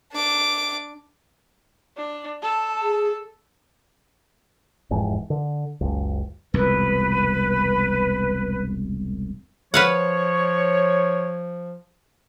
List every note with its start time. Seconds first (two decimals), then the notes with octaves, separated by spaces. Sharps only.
0.12 D4 D6
1.97 D4
2.42 A4 A5
2.82 G#4
4.91 F1 E2 G#2
5.30 D3
5.81 F#1 C#2
6.54 E1 C2 F2 B4
9.74 F3 B4 C#5 F5 F#5